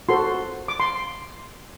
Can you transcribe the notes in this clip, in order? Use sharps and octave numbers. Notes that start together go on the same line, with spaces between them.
F#4 A4 C5 C6
D6
C6